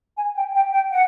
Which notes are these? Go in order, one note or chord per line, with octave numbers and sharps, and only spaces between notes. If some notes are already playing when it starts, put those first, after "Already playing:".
G#5
G5
G5
G5
F#5